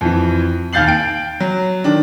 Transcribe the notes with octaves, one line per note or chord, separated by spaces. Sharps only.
F2 E3
D#2 F5 G6 A6 C7 F#7
G5 D7
F#3
D3 D#3 D4